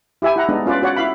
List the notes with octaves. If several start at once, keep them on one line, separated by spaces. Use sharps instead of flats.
E4 G4 E5 G#5
E4 F#5 A#5
G#3 B3 D4 D#4
C#4 F4 B4 D5
F#4 C#5 D5 F#5
E4 F5 B5